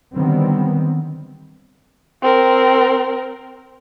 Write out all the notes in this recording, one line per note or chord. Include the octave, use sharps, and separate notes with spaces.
D3 D#3 F#3 G3 B3 C4
C4 A#4